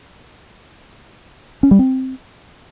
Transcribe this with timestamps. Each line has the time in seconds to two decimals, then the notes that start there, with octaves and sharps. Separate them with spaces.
1.63 C#4
1.71 G3
1.79 C4